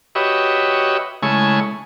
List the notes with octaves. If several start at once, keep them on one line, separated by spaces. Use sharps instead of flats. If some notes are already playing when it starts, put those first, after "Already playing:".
F#4 G4 B4 C#5 D#5 E5
C#3 G#3 A3 E4 G#5 C#6